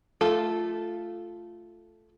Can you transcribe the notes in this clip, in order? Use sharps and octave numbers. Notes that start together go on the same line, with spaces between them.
A3 F4 A4